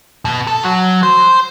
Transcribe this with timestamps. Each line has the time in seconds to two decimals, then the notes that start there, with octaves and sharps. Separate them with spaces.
0.25 B2
0.47 A4
0.63 F#3
1.03 C5